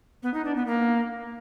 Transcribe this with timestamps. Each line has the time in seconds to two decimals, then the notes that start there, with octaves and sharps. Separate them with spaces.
0.23 B3
0.34 D#4
0.45 D4
0.56 B3
0.67 A#3